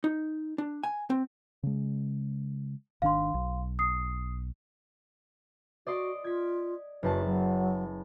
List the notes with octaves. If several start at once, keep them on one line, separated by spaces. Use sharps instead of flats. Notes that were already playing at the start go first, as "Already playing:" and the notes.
D#4
D4
G#5
C4
C#3 G#3
G#1 D#3 D4 F5 C6
B1
D#6 C7
F#4 D5 D#5 C6
F4 G#6 B6
F#1 F#4 B4 A5
F#3